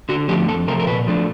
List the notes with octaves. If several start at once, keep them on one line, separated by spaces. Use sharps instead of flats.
D3 F#4
F3 A3 D4 G4
F2 A4
C3 F3 A3 A#4
A#4
A#2 B4
F3 A3 D4